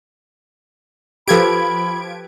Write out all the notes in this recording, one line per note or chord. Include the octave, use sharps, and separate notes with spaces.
F3 G4 A4 B4 B5 G#6 D7